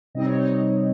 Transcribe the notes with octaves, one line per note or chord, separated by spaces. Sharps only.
C3 G3 C4 D#4 D#5
C#5
D#4 D#5